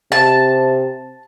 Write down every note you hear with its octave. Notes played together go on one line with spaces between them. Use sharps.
C3 A5